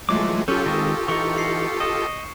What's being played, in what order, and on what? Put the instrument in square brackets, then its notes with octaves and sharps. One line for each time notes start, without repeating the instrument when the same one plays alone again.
[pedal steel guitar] E3 F4 D6 [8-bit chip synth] F#3 G#3 A3
[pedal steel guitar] F#3 C#4 [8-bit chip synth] F4 G4 A4 [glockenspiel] G6
[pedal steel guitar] D#3 G#3 C4 [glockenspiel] C#6 D#6 A#6
[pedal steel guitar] E3 D#4 [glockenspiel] C#6 C#7 F7
[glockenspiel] C7 C#7
[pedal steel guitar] D#5 [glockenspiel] E7